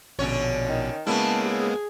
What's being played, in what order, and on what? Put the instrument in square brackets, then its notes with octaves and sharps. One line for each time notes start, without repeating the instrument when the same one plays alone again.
[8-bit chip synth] A#1 B2 [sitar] D3 C#4 C#5
[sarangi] D#3
[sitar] C#3 C#4 E4 [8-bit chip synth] G#3 A#3 B3 [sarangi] A5
[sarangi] G#4